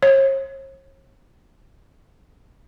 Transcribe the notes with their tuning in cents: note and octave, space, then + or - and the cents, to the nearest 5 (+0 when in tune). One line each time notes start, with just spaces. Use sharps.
C#5 -40